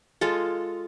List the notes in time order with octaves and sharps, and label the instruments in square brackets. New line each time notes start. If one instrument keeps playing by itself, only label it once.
[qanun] G#3 F4 A4